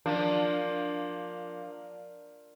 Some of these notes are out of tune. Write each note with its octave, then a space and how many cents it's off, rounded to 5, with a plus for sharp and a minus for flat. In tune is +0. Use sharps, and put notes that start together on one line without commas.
F3 +15 A#3 +0 D4 +0